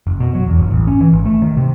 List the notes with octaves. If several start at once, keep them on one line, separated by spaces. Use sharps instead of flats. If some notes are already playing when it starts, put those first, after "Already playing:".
F#1
B2
F#3
E2
G1
A1
C#4
E3
G#1
A3
D#3
C3